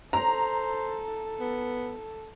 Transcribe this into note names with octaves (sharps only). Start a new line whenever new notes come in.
A4 C5 A#5
B3